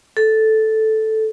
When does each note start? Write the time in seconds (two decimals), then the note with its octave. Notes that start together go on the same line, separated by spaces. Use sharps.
0.17 A4